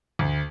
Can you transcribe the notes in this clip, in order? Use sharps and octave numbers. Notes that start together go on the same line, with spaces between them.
D2